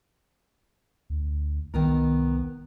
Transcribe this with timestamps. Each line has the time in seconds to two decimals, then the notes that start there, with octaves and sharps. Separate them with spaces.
1.10 D2
1.74 C2 D#3 B3 A#4